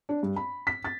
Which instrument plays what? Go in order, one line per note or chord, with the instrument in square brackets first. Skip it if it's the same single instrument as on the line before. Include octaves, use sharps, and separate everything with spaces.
[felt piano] D4
G2
B5
B6
A6